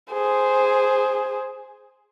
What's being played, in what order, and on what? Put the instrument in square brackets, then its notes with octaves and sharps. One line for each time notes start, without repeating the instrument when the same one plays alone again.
[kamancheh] G#4 C5